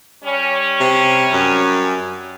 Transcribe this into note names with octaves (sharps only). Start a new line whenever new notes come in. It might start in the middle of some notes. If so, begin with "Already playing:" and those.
G3 C#4
C3
F#2